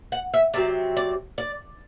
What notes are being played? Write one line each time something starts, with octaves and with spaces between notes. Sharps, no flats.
F#5
E5
C3 F#3 C4 D5
D5
D5